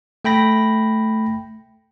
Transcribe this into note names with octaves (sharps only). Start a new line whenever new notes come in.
A3 G5 B5 A#6